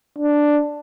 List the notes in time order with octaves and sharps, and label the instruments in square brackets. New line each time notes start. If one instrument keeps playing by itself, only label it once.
[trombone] D4